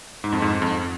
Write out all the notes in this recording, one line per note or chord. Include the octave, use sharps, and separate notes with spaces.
G#2
F2
G#2
F2